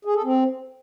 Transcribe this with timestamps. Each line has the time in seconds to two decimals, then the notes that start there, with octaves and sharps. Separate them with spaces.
0.05 G#4
0.14 A4
0.24 C4